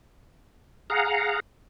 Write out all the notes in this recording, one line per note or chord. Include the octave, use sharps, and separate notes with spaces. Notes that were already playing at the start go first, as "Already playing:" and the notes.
G#4 F5 F#5 A#5